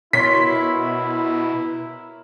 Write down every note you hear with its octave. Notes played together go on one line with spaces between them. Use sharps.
B2 E4 A#4 C#5 C6 B6